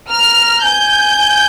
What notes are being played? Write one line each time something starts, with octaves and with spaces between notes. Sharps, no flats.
A#5 F6
G#5 G6
G#5